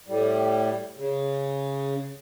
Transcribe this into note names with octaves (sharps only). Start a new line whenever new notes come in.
A2 G3
C#3